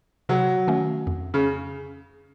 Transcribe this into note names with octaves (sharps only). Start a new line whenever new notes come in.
C3 F#3
D#3 A3 C#4
F2
C#3